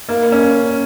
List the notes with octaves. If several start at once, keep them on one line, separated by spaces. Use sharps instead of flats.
A#3
C#4